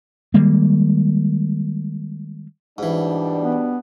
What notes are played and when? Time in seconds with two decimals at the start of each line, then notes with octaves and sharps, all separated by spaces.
0.34 D#3 G3 G#3 A#3
2.78 G#2 B2 E3 G3 D4
3.42 B3